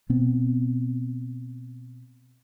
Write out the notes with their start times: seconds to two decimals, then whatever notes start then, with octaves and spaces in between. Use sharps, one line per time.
0.09 B2 B3 C4